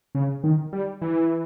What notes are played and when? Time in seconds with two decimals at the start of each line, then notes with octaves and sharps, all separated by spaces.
0.15 C#3
0.44 D#3
0.73 G3
1.02 E3